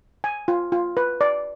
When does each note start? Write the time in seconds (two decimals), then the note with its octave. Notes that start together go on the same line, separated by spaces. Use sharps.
0.24 G#5
0.48 F4
0.72 F4
0.97 B4
1.21 D5